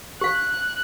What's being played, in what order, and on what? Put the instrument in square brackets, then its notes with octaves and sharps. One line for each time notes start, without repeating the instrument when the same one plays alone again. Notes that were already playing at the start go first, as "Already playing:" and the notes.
[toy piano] G4 F5 [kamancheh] F#6